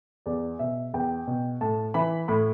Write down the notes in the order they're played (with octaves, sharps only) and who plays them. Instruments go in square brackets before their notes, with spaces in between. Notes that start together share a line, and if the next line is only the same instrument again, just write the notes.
[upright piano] E2 D5
B2 E5
E2 G5
B2
A2 A5
E3 B5
A2 B5